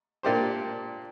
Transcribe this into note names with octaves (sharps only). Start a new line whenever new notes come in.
A#2 A#3 D4 G4 C5